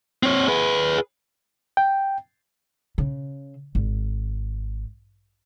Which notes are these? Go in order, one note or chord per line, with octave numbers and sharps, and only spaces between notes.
C4 C#5
G#4 B4
G5
C#3
G#1